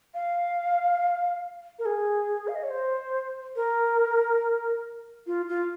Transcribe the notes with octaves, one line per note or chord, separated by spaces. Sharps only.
F5
A#4
G#4
F5
D#5
C#5
C5
A#4
F4
F4